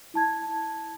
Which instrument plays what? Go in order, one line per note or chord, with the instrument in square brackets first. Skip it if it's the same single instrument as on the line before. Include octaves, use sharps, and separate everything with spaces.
[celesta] E4 A5 G#6